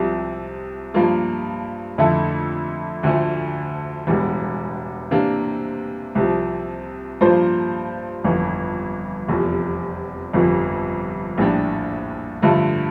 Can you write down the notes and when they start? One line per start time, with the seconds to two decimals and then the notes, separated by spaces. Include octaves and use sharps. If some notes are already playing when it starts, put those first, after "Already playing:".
Already playing: C2 C3 F3
0.94 G2 F3 A#3 F4
1.98 F2 D3 A3 E4 A4
3.03 D2 D3 F3 A3
4.07 E1 E2 E3 G3
5.11 C3 E3 A#3 D4
6.15 C2 C3 F3
7.21 G2 F3 A#3 F4 C5
8.24 G1 F2 E3
9.29 F1 E2 C3 F3
10.33 G1 F2 C3 F3
11.38 A#1 A2 G3 D4 G4
12.42 G2 D3 F3 A3